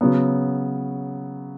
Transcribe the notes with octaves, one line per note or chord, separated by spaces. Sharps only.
C#3 F#3 B3